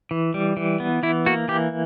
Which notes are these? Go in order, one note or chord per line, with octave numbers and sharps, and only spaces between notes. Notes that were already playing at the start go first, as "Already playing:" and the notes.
E3
G3
E3
B3
E3 E4
A#3 F#4
E3 G4